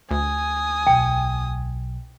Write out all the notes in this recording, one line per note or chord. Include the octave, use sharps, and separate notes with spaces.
D2 G#5 D#6
B1 G5